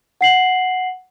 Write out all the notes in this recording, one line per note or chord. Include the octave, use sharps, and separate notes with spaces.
F#5 C7 F#7